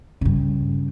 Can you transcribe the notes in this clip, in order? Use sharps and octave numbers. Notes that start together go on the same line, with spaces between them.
G2 C#3